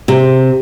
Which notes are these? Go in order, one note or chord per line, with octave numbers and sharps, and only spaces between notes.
C3